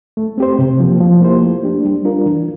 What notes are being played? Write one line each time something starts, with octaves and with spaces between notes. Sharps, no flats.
A3
C4 G4 C5
C3
F3 A#3
F3
A#3 E4 G4 C5
A3
D4 G4
G3
D4 F4 A#4
E3